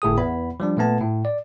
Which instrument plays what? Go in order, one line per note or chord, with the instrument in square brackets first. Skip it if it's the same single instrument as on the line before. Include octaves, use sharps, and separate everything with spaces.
[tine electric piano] G1 A2 G#4 D#6
E2 B3 B5
F3 G3 D4
A#2 A3 B3 A5
A2
D5